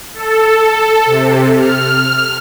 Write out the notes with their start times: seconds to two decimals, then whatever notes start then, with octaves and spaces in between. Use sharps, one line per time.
0.14 A4
1.06 C3
1.56 F6